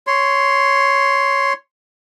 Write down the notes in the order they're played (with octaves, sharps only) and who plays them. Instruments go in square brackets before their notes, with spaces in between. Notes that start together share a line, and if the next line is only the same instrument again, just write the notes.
[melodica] C#5 C6